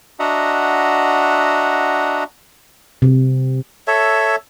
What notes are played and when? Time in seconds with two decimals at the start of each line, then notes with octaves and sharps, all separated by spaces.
0.20 D4 F#4 D#5 E5 F#5 A#5
3.02 C3
3.87 A4 C#5 E5